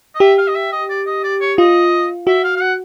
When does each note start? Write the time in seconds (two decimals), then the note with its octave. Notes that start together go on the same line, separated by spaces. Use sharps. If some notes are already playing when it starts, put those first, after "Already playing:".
0.15 D#5
0.20 G4 E5
0.38 F5
0.48 D#5
0.56 E5
0.72 D#5
0.90 D5
1.07 D#5
1.24 D5
1.41 C#5
1.58 F4 D#5
2.27 F#4 E5
2.44 F5
2.56 F5
2.62 F#5